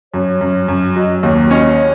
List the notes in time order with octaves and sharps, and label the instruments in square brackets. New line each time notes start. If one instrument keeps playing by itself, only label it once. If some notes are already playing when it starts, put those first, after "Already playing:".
[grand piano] F#2 [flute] C#5
[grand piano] F#2
F#2
[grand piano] F#3 [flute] D#5
[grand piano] D#2 [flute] C#5
[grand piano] C#4 [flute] D#5
[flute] C#5